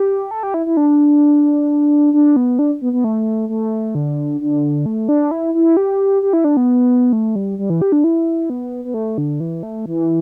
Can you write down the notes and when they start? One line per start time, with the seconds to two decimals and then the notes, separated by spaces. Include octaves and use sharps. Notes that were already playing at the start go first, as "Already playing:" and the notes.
Already playing: G4
0.31 A4
0.43 G4
0.54 E4
0.66 E4
0.77 D4
2.13 D4
2.36 B3
2.59 D4
2.82 B3
2.93 B3
3.04 A3
3.49 A3
3.95 D3
4.41 D3
4.86 A3
5.09 D4
5.31 E4
5.54 E4
5.77 G4
6.22 G4
6.33 E4
6.44 D4
6.57 B3
7.13 A3
7.36 G3
7.59 G3
7.70 E3
7.82 G4
7.92 D4
8.04 E4
8.50 B3
8.85 B3
8.94 A3
9.18 D3
9.40 E3
9.63 A3
9.86 E3